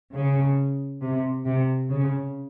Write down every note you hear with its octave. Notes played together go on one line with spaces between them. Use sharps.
C#3
C3
C3
C#3